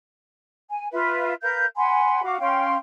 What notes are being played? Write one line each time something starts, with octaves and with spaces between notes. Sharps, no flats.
G#5
F4 B4 E5
A#4 B4 F5 G6
F#5 G#5 B5 C6
F#4 F5 D6
C#4 F5 G5 C6